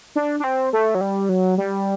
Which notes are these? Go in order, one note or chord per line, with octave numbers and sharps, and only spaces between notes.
D4
D4
C4
A3
F#3
G3
F#3
G3